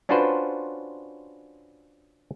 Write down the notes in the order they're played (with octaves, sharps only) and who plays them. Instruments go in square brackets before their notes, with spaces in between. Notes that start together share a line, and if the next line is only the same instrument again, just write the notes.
[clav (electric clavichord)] C#4 D4 F4 F#4 B4 C5